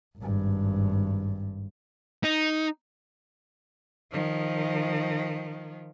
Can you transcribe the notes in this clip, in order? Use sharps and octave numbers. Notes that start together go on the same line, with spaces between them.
G#1 G2
D#4
D#3 F3